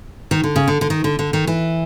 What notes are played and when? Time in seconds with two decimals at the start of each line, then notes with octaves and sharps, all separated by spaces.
0.31 D#3
0.44 D3
0.56 C#3
0.68 D3
0.81 D3
0.90 D#3
1.04 D3
1.19 D3
1.33 D#3
1.47 E3